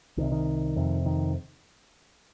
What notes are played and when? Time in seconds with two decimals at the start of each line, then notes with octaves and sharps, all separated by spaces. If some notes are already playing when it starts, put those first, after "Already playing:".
0.17 C2 C3 D#3
0.32 D#3
0.76 F2 C3
1.06 D#3